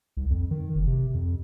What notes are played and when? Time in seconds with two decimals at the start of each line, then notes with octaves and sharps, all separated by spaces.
0.17 C2
0.30 F2
0.51 D#3
0.75 F#1
0.87 C3
1.14 F2